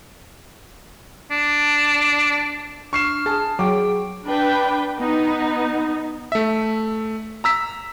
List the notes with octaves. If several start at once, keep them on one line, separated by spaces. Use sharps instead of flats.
D4
D4 C#6 F6 C7 E7
G#4 A5
F#3 G#4 G5 C#6 D6
D4 B4 G5
B3 D#4
A3 E5
A#5 E6 B6